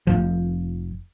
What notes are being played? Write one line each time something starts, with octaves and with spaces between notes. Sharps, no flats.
F1 B1 F3